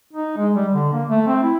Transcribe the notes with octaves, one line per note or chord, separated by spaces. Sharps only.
D#4
G#3
G3
D3
A#3
A3
C4
E4